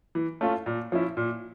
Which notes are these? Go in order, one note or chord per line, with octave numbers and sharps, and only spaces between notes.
E3
A3 C#4 F4
A#2
F3 C#4 E4
A#2